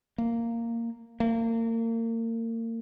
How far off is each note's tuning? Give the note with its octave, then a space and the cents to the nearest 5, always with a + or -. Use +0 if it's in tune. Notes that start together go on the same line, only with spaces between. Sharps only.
A#3 -10
A#3 -35